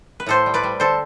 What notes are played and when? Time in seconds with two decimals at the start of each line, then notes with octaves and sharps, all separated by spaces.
0.20 B4
0.26 A2 A4 C5
0.46 G3
0.54 B4 D5
0.63 G3
0.80 D3 A4 C5